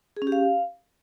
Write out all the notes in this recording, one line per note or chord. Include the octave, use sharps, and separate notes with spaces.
G#4
C#4
G4
F5